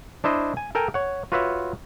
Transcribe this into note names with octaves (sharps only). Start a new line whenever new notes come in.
D4 E4 C5 D#5
G#5
A4 A#4 G5 G#5
C#5 F#5
F4 F#4 B4 C#5 E5 F#5